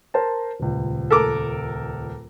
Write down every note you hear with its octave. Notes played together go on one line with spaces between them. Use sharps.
A#4 C5 A5
D#1 C#2
A4 A#4 D6